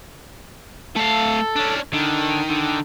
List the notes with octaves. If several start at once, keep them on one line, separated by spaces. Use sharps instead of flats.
A3 A4 F5
C#4 D4
D3 D#3
D3